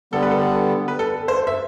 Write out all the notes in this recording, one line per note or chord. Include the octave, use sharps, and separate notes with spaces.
D3 G3 B3 A4
B4
A4
B4
A4
C5
E5